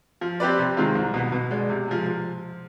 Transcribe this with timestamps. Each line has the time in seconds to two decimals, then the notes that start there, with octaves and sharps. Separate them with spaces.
0.21 F3
0.40 C4 G4 B4 D5
0.59 C3
0.77 D#3 G#3 C4 F4
0.95 C2
1.14 B2 B3
1.32 B2
1.51 G#3 D4
1.69 C3
1.88 F3 G#3
2.07 F3